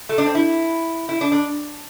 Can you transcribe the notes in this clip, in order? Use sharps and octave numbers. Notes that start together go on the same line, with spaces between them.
A3
D4
C4
E4
E4
D4
D4